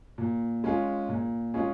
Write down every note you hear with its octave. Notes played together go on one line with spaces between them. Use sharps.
A#2
G#3 C#4 F4 G#4
A#2
G#3 C#4 F4 G#4